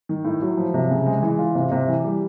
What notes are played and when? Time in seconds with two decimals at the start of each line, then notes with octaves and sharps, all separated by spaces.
0.09 D#3
0.25 A2
0.42 F#3
0.57 F3
0.74 C3
0.91 C#3
1.06 G#3
1.22 E3
1.39 F4
1.55 C3
1.72 C3
1.88 E3
2.04 G3